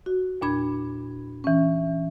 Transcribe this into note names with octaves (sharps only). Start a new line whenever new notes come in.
F#4
E2 A#2 D4 B5 G#6
E3 C#4